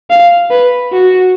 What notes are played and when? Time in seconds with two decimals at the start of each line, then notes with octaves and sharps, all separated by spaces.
0.10 F5
0.51 B4
0.93 F#4